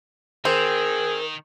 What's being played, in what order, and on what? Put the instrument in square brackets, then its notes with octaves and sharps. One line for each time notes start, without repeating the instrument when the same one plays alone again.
[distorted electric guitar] D#3 [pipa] C4 [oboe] G#4 [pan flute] A#4